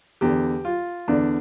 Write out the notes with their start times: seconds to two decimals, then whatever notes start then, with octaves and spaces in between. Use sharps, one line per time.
0.21 E2 D3 G4
0.65 F4
1.08 E2 D3 D4